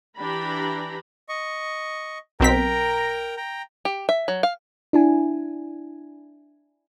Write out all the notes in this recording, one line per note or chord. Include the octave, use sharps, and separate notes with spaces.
E3 D4 G4 A#5 B5
D#5 C#6
B1 C4 A#4 G5 A#5 B6
G5 A#5
G4
E5
F#3
F5
D4 E4 G#5